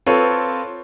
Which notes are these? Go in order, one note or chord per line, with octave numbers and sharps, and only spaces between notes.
C4 F4 A4 B4 C#5